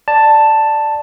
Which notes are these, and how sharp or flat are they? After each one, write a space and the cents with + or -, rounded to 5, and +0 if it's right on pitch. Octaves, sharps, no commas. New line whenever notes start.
D5 +10 A5 +5